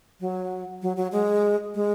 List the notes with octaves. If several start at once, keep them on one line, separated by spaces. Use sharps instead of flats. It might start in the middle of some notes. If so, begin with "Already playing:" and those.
F#3
F#3
F#3
G#3
G#3